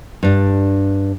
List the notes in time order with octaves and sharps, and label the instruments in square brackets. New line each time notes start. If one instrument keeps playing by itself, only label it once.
[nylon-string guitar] G2 D4